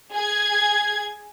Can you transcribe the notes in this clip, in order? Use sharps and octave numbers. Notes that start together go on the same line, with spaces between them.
G#4 G#6